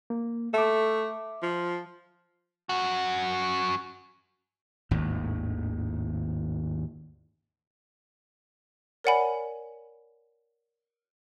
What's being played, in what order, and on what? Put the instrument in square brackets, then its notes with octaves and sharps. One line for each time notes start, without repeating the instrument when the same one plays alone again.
[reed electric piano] A#3
[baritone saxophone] A3 [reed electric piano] E5 D6
[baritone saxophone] F3
[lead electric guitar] F#2 F#4
[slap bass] G#1 D#2 A2
[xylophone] A#4 C#5 D5 F#5 G#5 B5